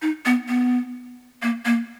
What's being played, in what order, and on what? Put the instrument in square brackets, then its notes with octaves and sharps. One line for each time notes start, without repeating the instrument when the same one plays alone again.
[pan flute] D#4
B3
B3
A#3
A#3